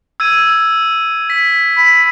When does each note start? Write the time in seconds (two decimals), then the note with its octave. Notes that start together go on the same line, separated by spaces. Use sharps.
0.20 E6 G#6 D#7
0.50 E6
1.30 B6
1.77 B5